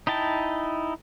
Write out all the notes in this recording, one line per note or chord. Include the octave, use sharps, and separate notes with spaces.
D#4 E4 G5 A5